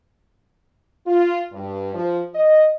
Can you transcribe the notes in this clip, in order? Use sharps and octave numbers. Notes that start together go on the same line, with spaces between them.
F4
G2
F3
D#5